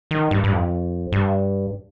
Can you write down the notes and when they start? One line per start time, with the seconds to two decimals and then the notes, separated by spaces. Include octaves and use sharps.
0.11 D#3
0.31 G2
0.44 G2
0.52 F2
1.12 G2